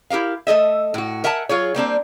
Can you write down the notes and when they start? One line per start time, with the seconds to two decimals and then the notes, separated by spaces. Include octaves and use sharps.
0.10 E4 G4 A#4 F5
0.47 A3 A4 D#5 E5
0.94 A2 F#4
1.24 A#4 E5 F#5 G#5 A5
1.49 F#3 F4 G#4 C#5
1.74 G3 A#3 C4 D4